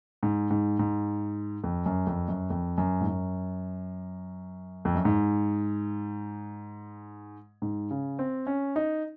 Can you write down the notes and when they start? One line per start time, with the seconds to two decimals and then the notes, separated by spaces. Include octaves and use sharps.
0.23 G#2
0.50 G#2
0.79 G#2
1.64 F2
1.86 F#2
2.07 F2
2.28 F#2
2.50 F2
2.78 F#2
3.01 G#2
3.07 F#2
4.85 F2
4.95 F#2
5.05 G#2
7.62 G#2
7.91 C#3
8.19 C4
8.47 C#4
8.76 D#4